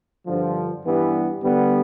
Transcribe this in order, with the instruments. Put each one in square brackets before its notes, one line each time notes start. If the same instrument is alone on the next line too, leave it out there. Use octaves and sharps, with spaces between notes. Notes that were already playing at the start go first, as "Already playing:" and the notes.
[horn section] G2 D3 F3
G2 E3 G3 B3
D3 G3 B3